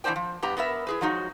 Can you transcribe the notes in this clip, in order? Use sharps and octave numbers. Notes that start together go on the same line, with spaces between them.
B2 E3 C4 D4 C5 G5
F3
G2 B3 G4 A#5
B3 A#4 B4 E5
E4 G#4 B4
F3 F#3 G#3 D#4 F#4